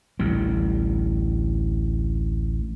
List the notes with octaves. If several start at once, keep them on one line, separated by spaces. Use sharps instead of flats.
A1 D2 G3